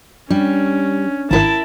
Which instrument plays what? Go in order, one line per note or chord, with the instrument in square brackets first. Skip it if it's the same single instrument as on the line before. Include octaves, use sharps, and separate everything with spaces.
[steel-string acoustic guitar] G3 [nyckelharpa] C#4 [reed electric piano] D4
[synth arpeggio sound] G#1 G#2 D#3 [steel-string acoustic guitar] E4 A#4 [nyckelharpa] A5